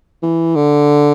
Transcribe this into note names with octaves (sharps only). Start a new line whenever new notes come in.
E3
D3